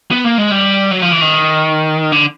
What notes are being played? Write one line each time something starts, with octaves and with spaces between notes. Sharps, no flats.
B3
A#3
G#3
G3
F#3
F3
E3
D#3
D3